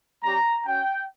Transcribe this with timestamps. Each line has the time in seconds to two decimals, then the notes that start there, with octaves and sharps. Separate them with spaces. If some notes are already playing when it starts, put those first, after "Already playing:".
0.23 G3 C#4 G4 A#5
0.66 C#4 F#4 G5